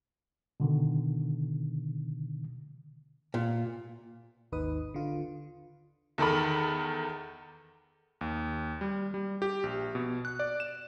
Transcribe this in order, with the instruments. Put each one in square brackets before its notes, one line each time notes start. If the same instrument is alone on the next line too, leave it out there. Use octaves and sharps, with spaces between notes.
[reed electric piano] B2 D3 D#3
[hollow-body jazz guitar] A#2
[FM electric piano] G#1 D#2 D#4 B4 D#6
D3 F4
[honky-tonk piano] E2 D#3 A4 A#4 B5
[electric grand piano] D#2
G3
G3
G4
A#1
B2
F#6
D5
E7